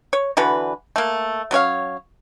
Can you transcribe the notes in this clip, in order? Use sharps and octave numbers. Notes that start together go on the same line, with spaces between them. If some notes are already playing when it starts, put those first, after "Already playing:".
C#5
D3 E3 F#4 B4
A3 A#3
F#3 C#4 C#5 F5